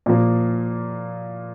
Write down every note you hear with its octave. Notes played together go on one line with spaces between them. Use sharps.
A#2 F3 A#3